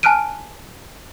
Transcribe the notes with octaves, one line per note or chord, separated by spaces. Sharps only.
G#5 A5 F6 F#6 D7 D#7